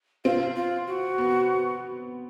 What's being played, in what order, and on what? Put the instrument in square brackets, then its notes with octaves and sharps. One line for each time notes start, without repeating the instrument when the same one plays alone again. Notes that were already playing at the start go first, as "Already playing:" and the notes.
[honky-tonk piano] C4 [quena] F4
[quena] F4
F#4
[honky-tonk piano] B3